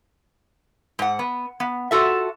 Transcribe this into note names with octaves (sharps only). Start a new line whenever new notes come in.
G#2 F#5
B3
B3
F4 F#4 A4 E5